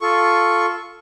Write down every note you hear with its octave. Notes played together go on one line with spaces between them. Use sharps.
F4 A4 C#6